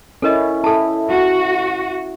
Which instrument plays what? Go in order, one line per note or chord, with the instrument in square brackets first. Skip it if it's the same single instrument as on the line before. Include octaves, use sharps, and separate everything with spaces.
[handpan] C#4 E4 [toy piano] A4 A#4 D#5
[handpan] E4 [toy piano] A4 A5
[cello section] F#4